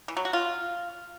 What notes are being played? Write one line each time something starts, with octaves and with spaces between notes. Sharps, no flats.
E3
F#3
F#4
F4